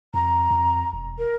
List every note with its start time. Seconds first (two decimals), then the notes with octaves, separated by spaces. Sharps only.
0.14 F2 A#5
0.51 F2
0.93 E1
1.18 A#4